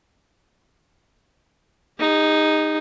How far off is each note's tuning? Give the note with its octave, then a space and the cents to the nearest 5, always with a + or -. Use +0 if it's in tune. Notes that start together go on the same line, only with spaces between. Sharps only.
D#4 -5 G#4 -45